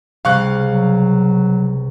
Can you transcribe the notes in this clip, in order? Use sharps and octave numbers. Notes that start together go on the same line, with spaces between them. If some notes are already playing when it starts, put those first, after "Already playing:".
C#2 C3 G3 F5 C#6 F#6
F#3